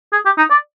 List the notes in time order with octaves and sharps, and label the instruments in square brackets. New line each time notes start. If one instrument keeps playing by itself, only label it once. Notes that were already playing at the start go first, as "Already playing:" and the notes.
[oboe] G#4
G4
D#4
D5